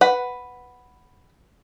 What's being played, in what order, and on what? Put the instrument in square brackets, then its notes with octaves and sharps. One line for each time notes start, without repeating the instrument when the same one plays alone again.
[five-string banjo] B4 F#5